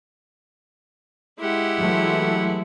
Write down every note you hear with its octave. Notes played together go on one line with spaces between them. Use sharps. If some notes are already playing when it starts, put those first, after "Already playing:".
G#3 E4 G4 F#5
E3 F#3 A3